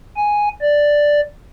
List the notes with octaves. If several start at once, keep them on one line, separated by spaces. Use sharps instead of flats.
G#5
D5